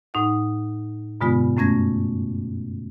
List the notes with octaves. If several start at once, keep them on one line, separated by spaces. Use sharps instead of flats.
A2 D#4 F#5
G2 B2 D3 G#3 B3 F4
F#2 A3 C#4 G#6 A#6